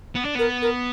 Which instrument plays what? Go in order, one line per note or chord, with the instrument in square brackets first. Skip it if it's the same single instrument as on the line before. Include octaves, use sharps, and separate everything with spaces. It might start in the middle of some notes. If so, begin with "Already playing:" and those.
[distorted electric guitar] B3
D4
[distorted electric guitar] B3 [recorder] A#4
[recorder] A#4